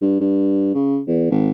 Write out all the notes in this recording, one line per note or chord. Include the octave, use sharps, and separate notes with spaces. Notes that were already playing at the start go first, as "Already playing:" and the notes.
G2
G2
C#3
E2
G#1